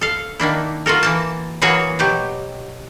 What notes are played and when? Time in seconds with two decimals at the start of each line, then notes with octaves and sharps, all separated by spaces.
0.01 A4 F5
0.40 D#3 A#3 D4 E4
0.86 F4 F#4 A4 A#4
1.03 E3 A#3 A5
1.62 E3 F#3 A#3 F#4 G#4 C#5
1.99 B2 F#3 G4